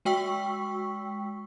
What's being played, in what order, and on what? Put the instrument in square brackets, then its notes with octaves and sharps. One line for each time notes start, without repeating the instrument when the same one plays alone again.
[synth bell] G#3 F#4 G5 C#6 E6 B6